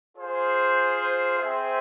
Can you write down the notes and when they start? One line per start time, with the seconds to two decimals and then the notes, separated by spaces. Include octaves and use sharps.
0.17 F4 G#4 C5
1.38 C4 G#4 C5 E5